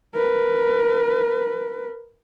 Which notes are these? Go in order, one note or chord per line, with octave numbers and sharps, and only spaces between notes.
A#4 B4